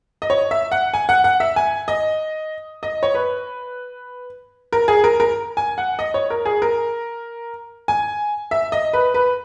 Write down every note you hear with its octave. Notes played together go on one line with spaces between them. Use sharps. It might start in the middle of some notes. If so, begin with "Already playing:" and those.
D#5
C#5
E5
F#5
G#5
F#5
F#5
E5
G#5
D#5
D#5
C#5
B4
A#4
G#4
A#4
A#4
G#5
F#5
D#5
C#5
A#4
G#4
A#4
G#5
E5
D#5
B4
B4